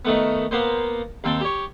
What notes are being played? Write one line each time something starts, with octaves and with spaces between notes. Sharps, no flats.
D#3 A3 B3
A#3 B3 C5
D#2 C4 G5 A5
G4 C#5